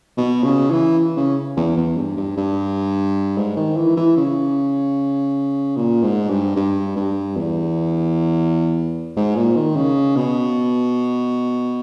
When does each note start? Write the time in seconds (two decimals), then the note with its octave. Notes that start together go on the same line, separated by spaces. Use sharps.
0.18 B2
0.44 C#3
0.71 E3
1.17 C#3
1.57 E2
1.77 E2
1.97 G2
2.17 G2
2.37 G2
3.38 G#2
3.57 D#3
3.77 E3
3.97 E3
4.17 C#3
5.77 A#2
6.03 G#2
6.30 G2
6.56 G2
6.97 G2
7.37 E2
9.17 G#2
9.36 A#2
9.56 D#3
9.76 C#3
10.16 B2